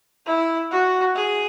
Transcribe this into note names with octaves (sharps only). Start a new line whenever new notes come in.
E4
F#4
G#4